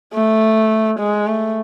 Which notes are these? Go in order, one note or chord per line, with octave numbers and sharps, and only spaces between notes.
A3
G#3
A3